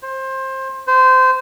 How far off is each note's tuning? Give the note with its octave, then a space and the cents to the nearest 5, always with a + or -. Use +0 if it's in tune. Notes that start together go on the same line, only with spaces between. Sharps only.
C5 +20
C5 -20